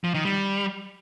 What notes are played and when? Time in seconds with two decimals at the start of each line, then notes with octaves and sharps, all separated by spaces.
0.04 F3
0.14 D#3
0.25 G3